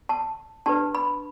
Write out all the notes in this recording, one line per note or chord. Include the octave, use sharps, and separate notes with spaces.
A5
D4 G4 B4 A5
B5